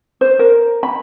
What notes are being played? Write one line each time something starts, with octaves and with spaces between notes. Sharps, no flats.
C5
A#4
B5